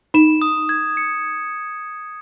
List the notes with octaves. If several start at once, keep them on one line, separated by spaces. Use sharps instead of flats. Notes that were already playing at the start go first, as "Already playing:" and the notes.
D#4 E7
D#6
G#6
C#7